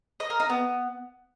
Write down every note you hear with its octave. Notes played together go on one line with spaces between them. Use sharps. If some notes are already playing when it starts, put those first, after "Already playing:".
D#5
A#4
D#4
B3